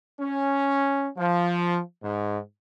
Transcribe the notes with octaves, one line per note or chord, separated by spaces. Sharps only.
C#4
F3
G#2